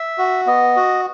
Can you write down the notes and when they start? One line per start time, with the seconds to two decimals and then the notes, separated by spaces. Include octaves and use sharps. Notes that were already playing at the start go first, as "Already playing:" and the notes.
Already playing: E5
0.18 F#4
0.47 B3 D#5
0.76 F#4